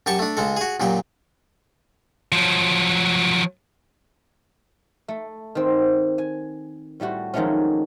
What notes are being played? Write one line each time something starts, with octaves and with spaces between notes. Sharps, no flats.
F#2 G4 A5 C#6
A3 D4
C#2 G#3 A4
F#4 G#4
F#2 A#2 F#3 G4
F3 F#3
A3
D#3 C4
G#5
A2 G3 A3 F#4
F2 D#3 F#3 G#3 A3 C#4